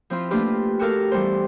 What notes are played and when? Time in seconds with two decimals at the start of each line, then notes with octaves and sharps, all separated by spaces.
0.10 F3 C4 E4 F4
0.30 A3 A#3 D4 F4 G4 B4
0.79 F#4 G4 A4 A#4 F5
1.11 E3 G3 B3 C5